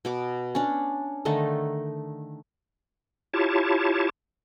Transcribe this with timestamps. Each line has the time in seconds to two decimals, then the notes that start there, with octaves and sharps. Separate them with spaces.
0.05 B2 B3 D6
0.55 C#4 D4
1.25 D3 D#3 A3 D#4
3.33 E4 F4 G4 C#5 A5